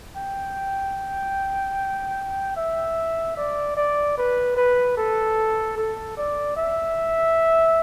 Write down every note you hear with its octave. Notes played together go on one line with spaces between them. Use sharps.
G5
E5
D5
D5
B4
B4
A4
A4
D5
E5